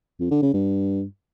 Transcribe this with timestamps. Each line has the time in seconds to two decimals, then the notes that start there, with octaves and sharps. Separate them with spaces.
0.19 F2
0.31 D3
0.42 C#3
0.54 G2